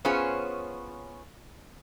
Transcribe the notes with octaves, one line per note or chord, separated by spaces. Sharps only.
B3 C#4 F4 G#4 C5 C#5